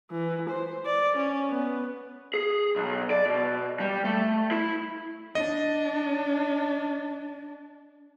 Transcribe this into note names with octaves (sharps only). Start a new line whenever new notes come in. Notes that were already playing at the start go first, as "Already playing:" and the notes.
E3
C5
D5
C#4
B3
G#4
B1
D5
B2
G3
A3
E4
D4 D#5